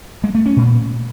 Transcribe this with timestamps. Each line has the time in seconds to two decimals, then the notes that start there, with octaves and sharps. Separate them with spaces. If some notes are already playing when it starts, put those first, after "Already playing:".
0.24 G#3
0.35 A3
0.46 C#4
0.57 A#2